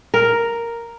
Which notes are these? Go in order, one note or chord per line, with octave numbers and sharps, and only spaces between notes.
A#4